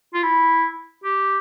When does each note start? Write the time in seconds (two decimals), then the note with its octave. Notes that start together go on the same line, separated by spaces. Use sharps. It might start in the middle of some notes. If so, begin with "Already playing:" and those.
0.14 F4
0.23 E4
1.04 G4